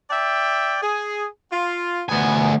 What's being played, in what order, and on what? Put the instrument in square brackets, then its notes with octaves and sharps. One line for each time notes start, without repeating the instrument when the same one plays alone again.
[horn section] D5 E5 G5
G#4
F4
[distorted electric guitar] D2 G#5 [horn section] B3